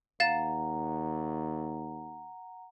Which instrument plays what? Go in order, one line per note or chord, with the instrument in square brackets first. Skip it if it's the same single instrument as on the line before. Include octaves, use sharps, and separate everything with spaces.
[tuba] D#2 [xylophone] F5 A6 E7 [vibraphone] F#5 A#5